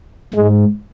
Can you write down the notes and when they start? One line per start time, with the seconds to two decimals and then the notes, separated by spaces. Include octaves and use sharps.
0.34 G#2 G#3